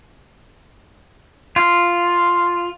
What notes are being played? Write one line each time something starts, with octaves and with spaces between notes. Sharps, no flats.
F4